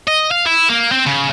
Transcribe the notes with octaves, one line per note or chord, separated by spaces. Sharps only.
D#5
F5
E4
A#3
C4
C#3